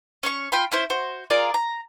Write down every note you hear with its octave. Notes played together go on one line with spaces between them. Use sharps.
C#4 C#5 C#6
F4 G5 B5 C6
C#4 E4 C5
F#4 C5
F4 G#4 A#4 D5
A#5